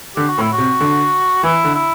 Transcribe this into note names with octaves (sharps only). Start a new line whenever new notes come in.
D3 G4
F#4
A2
E4
F#4
C3
D3
E3 E4
D3
E4